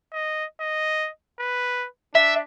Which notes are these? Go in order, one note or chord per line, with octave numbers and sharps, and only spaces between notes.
D#5
D#5
B4
D4 E5